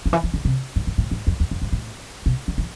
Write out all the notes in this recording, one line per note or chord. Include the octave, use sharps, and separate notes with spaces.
D3
E3
E3
D3
C3
G#2
G#2
A2
G#2
F2
E2
F2
G#2
A2
B2
D3
E3